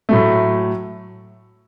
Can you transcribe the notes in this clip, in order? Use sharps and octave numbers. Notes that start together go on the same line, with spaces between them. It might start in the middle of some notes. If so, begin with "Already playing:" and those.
A2 F#3 A3